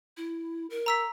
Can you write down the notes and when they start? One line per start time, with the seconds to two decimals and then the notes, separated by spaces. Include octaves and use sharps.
0.17 E4
0.70 A#4
0.86 A#5 E6 B6